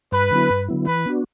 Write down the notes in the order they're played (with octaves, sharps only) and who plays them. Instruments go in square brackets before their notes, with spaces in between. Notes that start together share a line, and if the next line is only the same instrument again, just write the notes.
[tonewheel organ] G2 [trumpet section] B4
[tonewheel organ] D3 F#3 B3 E4
G2
D3 F#3 B3 E4
[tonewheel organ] E3 [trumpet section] B4
[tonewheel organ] B3 D4 F#4